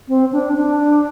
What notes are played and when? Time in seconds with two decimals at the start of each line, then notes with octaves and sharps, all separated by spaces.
0.09 C4
0.32 D4
0.56 D4